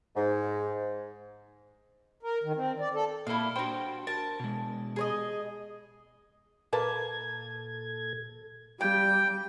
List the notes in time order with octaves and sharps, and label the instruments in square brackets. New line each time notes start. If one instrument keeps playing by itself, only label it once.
[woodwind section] G#2
[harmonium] A#4
D#3
C4
D5
A4
[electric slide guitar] A#2 A#3 A4 [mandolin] E4 F5
[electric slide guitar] D4 G5 [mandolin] F#4 C5
[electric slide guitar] A#4 [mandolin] A5
[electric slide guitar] B2 G#3
[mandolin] G#4 C#5 D#5
[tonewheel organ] A#2 A4 G#6 [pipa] A#3 B4 A5
[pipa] C#3 [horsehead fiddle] G3 [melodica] G5 [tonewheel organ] G6